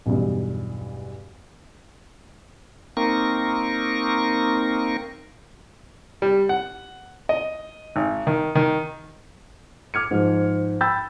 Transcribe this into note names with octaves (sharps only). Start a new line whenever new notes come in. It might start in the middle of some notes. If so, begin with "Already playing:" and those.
B1 E2 G2
A#3 C4 D#4 A#4 C#6
G3
F#5
D#5
G#1
D#3
D#3
D6 F6 G#6 C#7
G#2 F3
G5 B5 E6 G6 A6